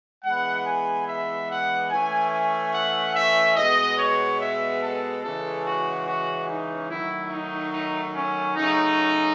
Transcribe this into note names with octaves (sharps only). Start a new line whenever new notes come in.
E3 G#3 B3 F#5
G#5
E5
F#5
E3 A3 C#4 G#5
G#5
F#5
E5
B2 G#3 B3 D#5
C#5
E5
A4
C#3 E3 G#3 C#4 A4
F#4
F#4
D#4
D#3 F#3 A3 E4
D#4
D#4
C#4
C#3 F#3 A3 C#4 D#4